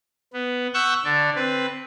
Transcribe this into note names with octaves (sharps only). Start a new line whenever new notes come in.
B3
F#5 C#6 E6 F#6 G6
D3 D5
C4 B4